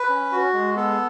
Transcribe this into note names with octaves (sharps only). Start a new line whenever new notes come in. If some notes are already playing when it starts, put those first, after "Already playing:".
Already playing: B4
C#4
F#4
G#3
B3 A4